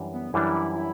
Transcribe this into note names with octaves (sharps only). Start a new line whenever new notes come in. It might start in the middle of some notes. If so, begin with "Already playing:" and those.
Already playing: F#2 E3 G3 D4
B3
F#2 E3 G3 D4 E4
E4